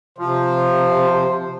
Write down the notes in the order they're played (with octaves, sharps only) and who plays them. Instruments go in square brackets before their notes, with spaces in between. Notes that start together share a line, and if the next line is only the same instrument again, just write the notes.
[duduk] C3 [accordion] F3 [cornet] C5